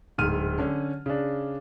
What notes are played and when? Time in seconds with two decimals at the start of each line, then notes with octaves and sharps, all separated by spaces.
0.18 D1 G#2 F6 D#7
0.58 D3 C#4
1.06 C#3 D4